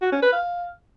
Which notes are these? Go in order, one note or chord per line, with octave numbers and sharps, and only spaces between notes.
F#4
C#4
B4
F5